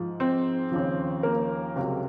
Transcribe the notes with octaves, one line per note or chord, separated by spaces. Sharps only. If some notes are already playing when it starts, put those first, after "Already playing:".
Already playing: G#2 F3
C4 C5
D#2 C#3 F3
A#3 A#4
C#2 C3 F#3